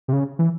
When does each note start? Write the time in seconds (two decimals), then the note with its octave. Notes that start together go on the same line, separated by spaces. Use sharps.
0.08 C3
0.13 C#3
0.39 E3